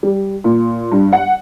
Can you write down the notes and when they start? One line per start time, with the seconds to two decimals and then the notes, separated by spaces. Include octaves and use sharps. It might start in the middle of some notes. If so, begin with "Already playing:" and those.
0.03 G3
0.44 A#2
0.92 G2
1.13 F#5